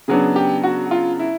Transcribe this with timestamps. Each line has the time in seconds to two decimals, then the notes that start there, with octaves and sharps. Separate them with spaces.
0.08 C#3 F#3 B3 D4 G#4
0.36 G4
0.63 F#4
0.91 F4
1.19 E4